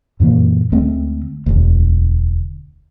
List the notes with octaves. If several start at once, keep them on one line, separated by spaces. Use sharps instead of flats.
F#2 A#2 E3 A#3
D2 G#3 A3 C4
E1 D2